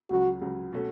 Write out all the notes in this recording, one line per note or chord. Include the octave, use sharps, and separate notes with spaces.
C#2 C#3 F#3 F#4
C#2 C#3 F#3
B2 A3 C#4